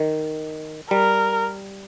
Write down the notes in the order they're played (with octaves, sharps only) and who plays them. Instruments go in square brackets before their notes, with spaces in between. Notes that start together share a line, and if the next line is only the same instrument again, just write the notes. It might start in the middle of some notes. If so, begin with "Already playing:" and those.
Already playing: [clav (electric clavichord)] D#3
[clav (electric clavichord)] G3 [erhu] A#4